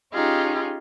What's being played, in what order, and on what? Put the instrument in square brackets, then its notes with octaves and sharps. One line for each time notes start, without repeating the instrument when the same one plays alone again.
[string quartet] C#4 D#4 F4 G4 G#4